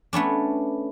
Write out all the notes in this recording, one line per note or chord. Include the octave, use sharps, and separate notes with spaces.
A3 B3 C#4 D4